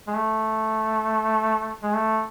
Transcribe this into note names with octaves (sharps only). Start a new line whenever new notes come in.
G#3
A3
G#3
A3